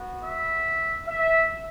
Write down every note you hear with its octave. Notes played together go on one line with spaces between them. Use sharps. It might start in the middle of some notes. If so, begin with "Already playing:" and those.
Already playing: B3 F#4
E5
E5